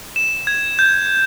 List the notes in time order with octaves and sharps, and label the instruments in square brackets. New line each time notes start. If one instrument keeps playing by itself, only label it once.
[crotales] E7
G#6
G6